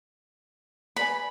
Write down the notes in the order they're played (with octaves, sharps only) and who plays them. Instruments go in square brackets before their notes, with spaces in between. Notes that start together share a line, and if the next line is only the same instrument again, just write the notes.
[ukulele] B4 D5 G#5 [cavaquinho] B5